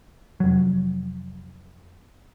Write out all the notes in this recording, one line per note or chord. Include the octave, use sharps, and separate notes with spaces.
F1 F#3